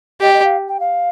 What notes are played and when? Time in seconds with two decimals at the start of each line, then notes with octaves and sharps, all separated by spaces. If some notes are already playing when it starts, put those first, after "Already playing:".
0.21 G4 D#5
0.34 D#5
0.44 F5
0.68 G5
0.80 F5